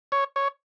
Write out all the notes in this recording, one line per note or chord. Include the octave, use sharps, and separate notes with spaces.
C#5
C#5